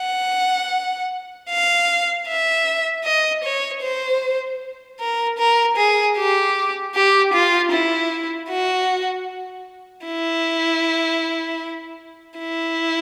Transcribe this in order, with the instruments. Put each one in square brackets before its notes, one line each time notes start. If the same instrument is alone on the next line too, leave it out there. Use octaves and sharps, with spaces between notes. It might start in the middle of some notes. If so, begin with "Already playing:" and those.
Already playing: [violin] F#5
F5
E5
D#5
C#5
C5
A#4
A#4
G#4
G4
G4
F4
E4
F#4
E4
E4